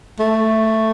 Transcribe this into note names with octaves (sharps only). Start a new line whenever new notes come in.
A3